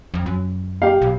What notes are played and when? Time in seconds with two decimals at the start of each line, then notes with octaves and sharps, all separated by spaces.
0.14 F2
0.26 F#2
0.82 G4 F5
1.02 B1